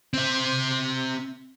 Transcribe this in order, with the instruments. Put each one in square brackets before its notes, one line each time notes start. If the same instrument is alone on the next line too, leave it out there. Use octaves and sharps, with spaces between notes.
[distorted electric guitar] C4 E5